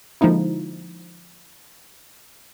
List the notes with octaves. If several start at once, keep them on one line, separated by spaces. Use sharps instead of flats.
D3 F3 G#3 A#3 D#4 E4